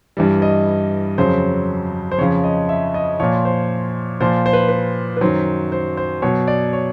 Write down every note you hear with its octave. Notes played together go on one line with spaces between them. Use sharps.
G2 E3 G3
D#5
F2 C#3 F#3 C5
C5
F2 C#3 F3 C#5
D#5
E5
D#5
A#2 F3 C#5
C5
A#2 F3 C5
C5
B4
B4
B4
F#2 D#3 F#3 C5
C5
C5
B2 F#3 C#5
D5
C#5